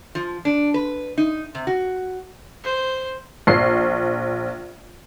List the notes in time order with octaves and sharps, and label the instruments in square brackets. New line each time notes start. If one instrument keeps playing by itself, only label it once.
[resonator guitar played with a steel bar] F3
D4
B4
D#4
C3
F#4
[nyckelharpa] C5
[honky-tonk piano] A#1 C7